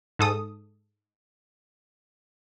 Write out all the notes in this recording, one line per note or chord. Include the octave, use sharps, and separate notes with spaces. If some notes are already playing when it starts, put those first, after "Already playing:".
G#2 A4 D#6